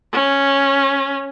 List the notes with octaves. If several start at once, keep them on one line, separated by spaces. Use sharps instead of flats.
C#4